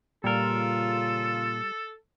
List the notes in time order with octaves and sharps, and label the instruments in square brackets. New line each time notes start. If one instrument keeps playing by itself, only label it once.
[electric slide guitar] A#2 A#4 [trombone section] C#3 F4 [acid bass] G3 [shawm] A4